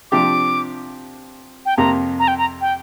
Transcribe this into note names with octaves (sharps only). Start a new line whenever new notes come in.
C3 F3 D4 G4 D6
G5
F2 C3 A#3 G4 A#5
A#5
G5
A#5
G5